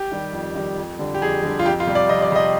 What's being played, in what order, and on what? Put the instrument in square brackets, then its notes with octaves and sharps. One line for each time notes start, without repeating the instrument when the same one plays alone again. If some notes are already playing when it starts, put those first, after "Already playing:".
Already playing: [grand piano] G4
D#3 G3
F2
D#3 G3
F2
D3 G3
G4
F2 G#4
D3 G3
F4
F2 G4
F4
C3 G3
D5
F2 D#5
D5
C3 G3 D#5